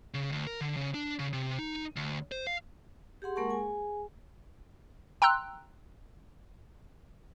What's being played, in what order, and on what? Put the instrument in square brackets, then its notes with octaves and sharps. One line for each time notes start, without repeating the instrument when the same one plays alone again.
[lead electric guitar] C#3
D2
A#4
D3
C#3
D4
C#3
C3
D#4
D2
C5
F5
[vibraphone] G4 G#4 F#5 C6
G#3 A#3 A#4 F#5 A5 C#6
G#4 G#5
[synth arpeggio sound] G5 A#5 C6 E6 F#6